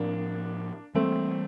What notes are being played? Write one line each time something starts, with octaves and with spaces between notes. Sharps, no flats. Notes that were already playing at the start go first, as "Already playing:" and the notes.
Already playing: A2 F3 A#3 C4 D4
E3 G3 A3 A#3 C4